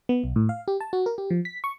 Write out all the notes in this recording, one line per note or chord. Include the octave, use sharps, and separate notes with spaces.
B3
B1
A2
F5
G4
A5
F#4
A#4
G4
F3
B6
C#6